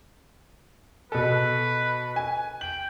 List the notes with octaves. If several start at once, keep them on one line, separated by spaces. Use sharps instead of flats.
B2 A4 B4
G#5
G5 F#7